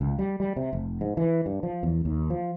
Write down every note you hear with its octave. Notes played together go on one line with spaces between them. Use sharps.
C#2
G3
G3
C3
F1
G#2
E3
G2
F3
E2
D#2
F3